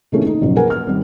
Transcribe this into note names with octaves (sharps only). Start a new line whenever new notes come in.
C3 D#3 E3 A3 A#3 C#4
D#4
F#1 F#2 B2 F3 F#3
A#3 A#4 B4 F#5 G#5
F6
G#1 G3